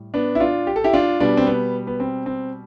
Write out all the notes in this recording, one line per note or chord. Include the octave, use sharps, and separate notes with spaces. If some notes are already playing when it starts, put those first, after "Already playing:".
Already playing: A2 G3
B3 D4
E4
D4 F4
G4
A4
E4 G4
D4 F4
B2 G3 B3 D4
C4
B3
B3
C4
C4